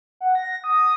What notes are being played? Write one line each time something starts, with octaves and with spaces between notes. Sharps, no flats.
F#5
A#6
D#6